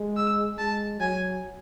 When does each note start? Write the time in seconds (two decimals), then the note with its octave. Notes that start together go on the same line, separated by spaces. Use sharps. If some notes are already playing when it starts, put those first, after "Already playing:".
Already playing: G#3
0.17 E6
0.58 G#3 A5
1.00 F#3 G#5